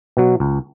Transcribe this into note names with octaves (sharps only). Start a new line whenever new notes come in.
B2 F#3
C#2